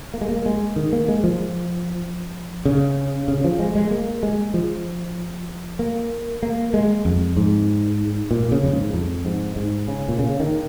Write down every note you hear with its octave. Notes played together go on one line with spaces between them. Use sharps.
A#3
G#3
A#3
G#3
D#3
A#3
G#3
F3
C#3
C#3
F3
G#3
G#3
A#3
G#3
F3
A#3
A#3
G#3
F2
G#2
A#2
C#3
F2
G#2
F2
G#2
G#2
C#3
A#2
C#3
D#3